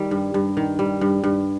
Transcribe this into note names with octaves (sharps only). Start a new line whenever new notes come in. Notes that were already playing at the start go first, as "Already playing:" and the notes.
Already playing: D#3 G3
G2
G2
D#3
G3
G2
G2